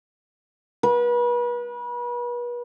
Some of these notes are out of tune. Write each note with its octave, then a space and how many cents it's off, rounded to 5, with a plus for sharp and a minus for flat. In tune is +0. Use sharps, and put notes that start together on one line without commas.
B4 -35